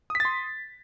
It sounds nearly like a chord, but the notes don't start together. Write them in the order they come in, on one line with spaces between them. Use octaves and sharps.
D#6 B6 A6 C6